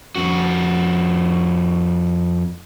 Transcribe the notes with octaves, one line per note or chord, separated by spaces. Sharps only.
F2 F#4